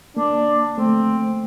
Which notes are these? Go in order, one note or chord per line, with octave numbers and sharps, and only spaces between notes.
A#3 D4
A3 C4